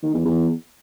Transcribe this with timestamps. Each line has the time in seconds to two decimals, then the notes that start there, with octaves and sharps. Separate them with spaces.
0.03 D#3
0.14 E2
0.25 E2